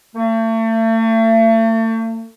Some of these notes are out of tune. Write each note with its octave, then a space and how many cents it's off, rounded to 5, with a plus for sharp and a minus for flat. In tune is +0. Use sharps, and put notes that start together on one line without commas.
A3 +40